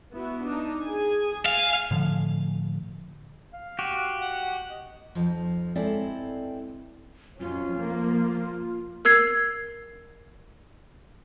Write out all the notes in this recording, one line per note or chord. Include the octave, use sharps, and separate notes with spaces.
B3 E4 F#4
D4 D#4
G#4 G#5
F5 G#5
A2 D3 F3
F5
F#4 G4
F#5
D#5
F2 F3 D#4
G2 G#3 C4 E4 A4 D5
F2 F#3 C#4 F4
F3 A#3
A#4 E6 G#6 C7